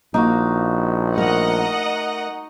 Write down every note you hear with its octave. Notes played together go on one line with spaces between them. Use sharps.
A#1 A#3 D#4 F#4 F5
A3 A#4 D#5 F#5 A#5